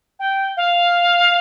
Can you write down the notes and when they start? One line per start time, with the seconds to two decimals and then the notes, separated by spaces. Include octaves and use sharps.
0.19 G5
0.57 F5